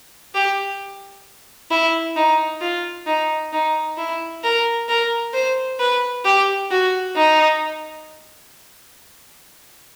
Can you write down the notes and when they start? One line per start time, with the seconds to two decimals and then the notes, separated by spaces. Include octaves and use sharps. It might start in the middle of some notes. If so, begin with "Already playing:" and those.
0.35 G4
1.71 E4
2.16 D#4
2.61 F4
3.07 D#4
3.53 D#4
3.98 E4
4.44 A#4
4.89 A#4
5.34 C5
5.80 B4
6.25 G4
6.71 F#4
7.16 D#4